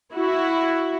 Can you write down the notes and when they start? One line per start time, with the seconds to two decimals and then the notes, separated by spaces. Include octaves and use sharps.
0.14 E4 F#4